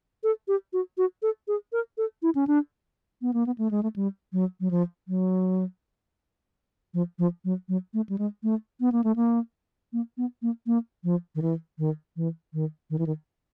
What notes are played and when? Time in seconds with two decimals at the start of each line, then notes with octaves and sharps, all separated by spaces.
0.23 A4
0.48 G4
0.73 F#4
0.98 F#4
1.22 A4
1.48 G#4
1.72 A#4
1.98 A4
2.22 E4
2.35 C#4
2.47 D4
3.22 B3
3.33 A#3
3.46 B3
3.58 A3
3.71 G#3
3.83 A3
3.96 G3
4.33 F#3
4.60 F#3
4.71 F3
5.08 F#3
6.94 F3
7.19 F3
7.45 F#3
7.69 F#3
7.94 A3
8.09 G3
8.18 G#3
8.43 A3
8.81 B3
8.92 A#3
9.04 A3
9.16 A#3
9.93 A#3
10.17 B3
10.42 A#3
10.67 A#3
11.04 F3
11.35 D#3
11.42 E3
11.79 D#3
12.16 E3
12.53 D#3
12.90 D#3
12.99 E3
13.07 D#3